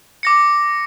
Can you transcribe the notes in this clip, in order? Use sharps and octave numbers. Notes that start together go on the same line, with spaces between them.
D6 A#6 C#7